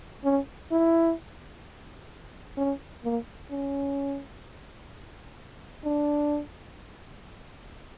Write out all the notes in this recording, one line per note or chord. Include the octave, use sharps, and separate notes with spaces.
C#4
E4
C#4
A#3
C#4
D4